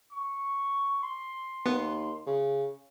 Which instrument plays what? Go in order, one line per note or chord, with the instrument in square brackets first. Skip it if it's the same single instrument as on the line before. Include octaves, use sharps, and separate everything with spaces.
[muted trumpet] C#6
C6
[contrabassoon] D#2 [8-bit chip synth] B3
[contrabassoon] C#3